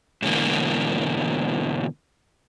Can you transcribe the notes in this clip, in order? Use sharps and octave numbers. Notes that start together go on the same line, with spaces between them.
G#2 B2 D3 E3 A#3